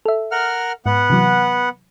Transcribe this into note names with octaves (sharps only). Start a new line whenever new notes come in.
A4 E5
A#4 F#5 F6
G#2 B3 F#5
C3 E3 F#3